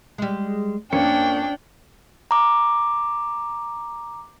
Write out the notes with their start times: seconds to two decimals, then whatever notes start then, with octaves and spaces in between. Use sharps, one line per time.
0.18 G3 G#3
0.92 F2 A#3 C#4 D4 G5 C#7
2.31 A#5 D6